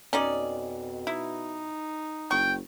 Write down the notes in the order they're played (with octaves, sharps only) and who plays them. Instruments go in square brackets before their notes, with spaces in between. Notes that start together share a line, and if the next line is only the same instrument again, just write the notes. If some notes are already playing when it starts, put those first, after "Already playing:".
[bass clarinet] F2 [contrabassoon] B2 [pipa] C#4 D#4 D5
[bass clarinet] D#4 [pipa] E4
[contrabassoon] F#1 [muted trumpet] G5 [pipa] C#6